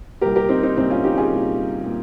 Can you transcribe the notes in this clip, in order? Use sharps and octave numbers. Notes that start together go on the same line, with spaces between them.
C2 A#2 G4 A#4
G4 A#4
C4 D#4
C4 D#4
C2 A#2 C4 D#4
C#4 F4
D#4 G4
F4 G#4
C2 A#2
A#2